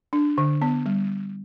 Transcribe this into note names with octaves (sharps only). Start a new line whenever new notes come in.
D4
D3
B3
G3